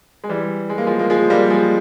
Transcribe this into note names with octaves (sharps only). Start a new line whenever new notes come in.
G#3
E3 G3
G#3
A#3
F3 G#3
A#3
F3 G#3
G3 A#3
F3 G#3